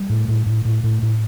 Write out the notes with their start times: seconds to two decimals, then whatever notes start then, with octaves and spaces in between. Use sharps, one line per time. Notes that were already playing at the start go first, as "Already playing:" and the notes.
Already playing: G3
0.10 A2
0.28 A2
0.46 A2
0.65 A2
0.84 A2
1.02 A2